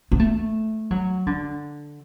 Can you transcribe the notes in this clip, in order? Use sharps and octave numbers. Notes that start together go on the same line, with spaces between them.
B3
A3
F#3
D3